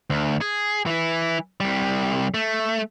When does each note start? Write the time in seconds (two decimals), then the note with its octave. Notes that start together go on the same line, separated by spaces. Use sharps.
0.10 D2
0.41 G#4
0.86 E3 E4
1.60 C2 G3
2.34 A3